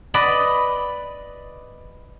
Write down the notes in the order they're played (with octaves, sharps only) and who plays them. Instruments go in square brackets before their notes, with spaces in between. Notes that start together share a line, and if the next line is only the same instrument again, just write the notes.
[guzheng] B4 D5 D#5 B5